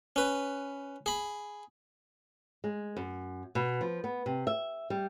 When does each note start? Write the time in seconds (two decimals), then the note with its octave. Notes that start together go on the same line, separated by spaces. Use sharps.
0.16 C#4 B4
1.06 G#4 B5
2.64 G#3
2.96 F#2
3.55 B2
3.81 F3
4.04 B3
4.26 C3
4.47 E5
4.90 G3